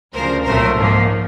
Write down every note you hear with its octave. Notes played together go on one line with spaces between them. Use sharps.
D2 C#3 F3 A#4 C5
C2 A#2 F#3 A3 A#4 C5
G#2 F3 A#3